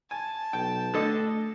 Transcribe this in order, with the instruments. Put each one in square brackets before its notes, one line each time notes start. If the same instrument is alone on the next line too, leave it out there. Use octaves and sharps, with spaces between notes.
[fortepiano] G#5 [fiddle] A5
[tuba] B1 [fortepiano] G5
[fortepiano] D3 A4 D#5 [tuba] A3